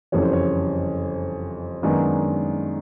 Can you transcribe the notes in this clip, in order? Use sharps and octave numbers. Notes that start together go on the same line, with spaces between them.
F#1 F2 C#3 E3 G3 C#5
C5
C#5
F#2 D#3 G#3 B3 D4